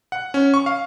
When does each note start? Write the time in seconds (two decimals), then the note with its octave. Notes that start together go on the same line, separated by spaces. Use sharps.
0.12 F#5
0.34 C#4
0.54 C#6
0.66 F5